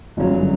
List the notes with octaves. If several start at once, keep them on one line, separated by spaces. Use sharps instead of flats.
G1 F#2 C#3 F#3